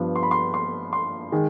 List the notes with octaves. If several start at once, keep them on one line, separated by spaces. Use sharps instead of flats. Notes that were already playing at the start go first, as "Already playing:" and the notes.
Already playing: G2 F3 B3
C6
B5
C6
C6
C6
D#3 G#3